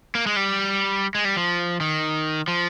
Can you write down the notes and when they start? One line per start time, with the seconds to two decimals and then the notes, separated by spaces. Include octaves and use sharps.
0.15 A#3
0.26 G#3
0.36 G3
1.15 G#3
1.25 G3
1.37 F3
1.81 D#3
2.48 F3